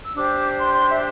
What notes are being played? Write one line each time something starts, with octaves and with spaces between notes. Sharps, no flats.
E6
D4 G4 C5 D6
C6
C6
E5